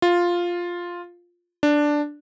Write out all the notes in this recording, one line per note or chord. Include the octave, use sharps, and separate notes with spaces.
F4
D4